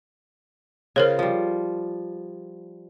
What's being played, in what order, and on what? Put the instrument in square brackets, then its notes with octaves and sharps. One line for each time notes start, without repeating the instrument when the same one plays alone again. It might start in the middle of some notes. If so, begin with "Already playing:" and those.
[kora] C#3 F4 [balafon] A#4 C5 C#5
[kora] F3 G3